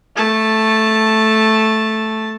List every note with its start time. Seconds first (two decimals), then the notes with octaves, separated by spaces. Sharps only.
0.16 A3 A5